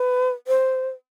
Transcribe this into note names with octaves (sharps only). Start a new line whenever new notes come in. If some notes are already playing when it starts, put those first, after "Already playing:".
Already playing: B4
C5